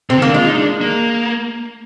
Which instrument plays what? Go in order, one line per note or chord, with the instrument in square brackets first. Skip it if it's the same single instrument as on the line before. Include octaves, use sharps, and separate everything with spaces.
[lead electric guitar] C3 [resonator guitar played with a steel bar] C4
[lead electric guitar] D#3
[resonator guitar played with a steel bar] A#3
[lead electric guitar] D4
[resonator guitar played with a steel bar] G#3 [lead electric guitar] F4
[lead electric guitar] D#4
D4
A#3